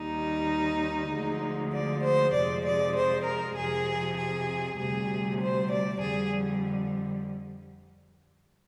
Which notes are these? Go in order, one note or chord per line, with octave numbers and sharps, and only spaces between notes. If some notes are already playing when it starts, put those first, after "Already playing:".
Already playing: D#2 D#3 G3 D#4
D2 D3 F3 G#3
D5
C5
F2 C3 F3 G#3 D5
D5
C5
A#4
F2 C3 F3 G#4
G#4
D2 C3 G3 G#4
C5
D5
F2 D3 G3 G#4